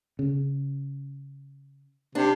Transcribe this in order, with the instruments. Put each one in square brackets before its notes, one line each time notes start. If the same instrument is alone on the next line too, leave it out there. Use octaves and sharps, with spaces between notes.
[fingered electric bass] C#3
[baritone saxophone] C3 [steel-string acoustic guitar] D4